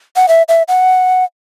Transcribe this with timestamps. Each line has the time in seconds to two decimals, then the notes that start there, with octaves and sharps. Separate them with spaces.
0.16 F#5
0.29 E5
0.49 E5
0.68 F#5